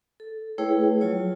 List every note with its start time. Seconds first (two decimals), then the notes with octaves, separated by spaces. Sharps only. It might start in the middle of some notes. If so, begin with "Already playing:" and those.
0.20 A4
0.58 A3 E4 G#4 B4 C#5 G5
1.01 F#3 F4 C#5